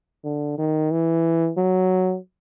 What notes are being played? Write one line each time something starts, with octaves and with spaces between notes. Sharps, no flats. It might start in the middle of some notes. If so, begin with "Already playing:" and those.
D3
D#3
E3
F#3